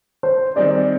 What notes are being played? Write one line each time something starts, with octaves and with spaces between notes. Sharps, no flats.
C5
D#3 G3 C4 D#4 G#4 D5